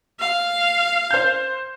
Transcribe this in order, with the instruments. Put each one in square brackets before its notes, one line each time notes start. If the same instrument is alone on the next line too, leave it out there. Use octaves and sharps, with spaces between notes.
[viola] F5
[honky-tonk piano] C5 G6